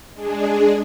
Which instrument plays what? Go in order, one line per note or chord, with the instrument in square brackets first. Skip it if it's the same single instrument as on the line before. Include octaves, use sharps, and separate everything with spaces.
[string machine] G#3 D4 G#4